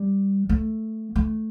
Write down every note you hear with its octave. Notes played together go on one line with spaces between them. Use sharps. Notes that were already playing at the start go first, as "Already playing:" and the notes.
Already playing: G3
A3
A3